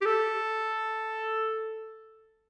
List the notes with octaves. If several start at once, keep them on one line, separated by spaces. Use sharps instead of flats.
G4
A4